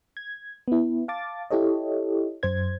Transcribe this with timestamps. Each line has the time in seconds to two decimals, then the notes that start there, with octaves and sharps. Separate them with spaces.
0.17 G#6
0.68 B3 E4
1.08 F5 A5 D6 A6
1.51 E4 G4 A4 C#5 D#5
2.43 F#2 C5 G#6